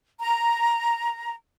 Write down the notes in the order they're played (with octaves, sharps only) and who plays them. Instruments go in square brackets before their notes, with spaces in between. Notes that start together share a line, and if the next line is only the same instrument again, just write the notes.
[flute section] A#5